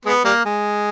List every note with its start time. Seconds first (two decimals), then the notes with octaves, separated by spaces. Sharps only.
0.05 G#3 B3
0.25 G3 A#3
0.45 G#3